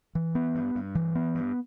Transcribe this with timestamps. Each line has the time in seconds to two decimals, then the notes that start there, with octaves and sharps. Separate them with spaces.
0.15 E3
0.35 B3
0.55 G2
0.75 G2
0.95 E3
1.15 B3
1.35 G2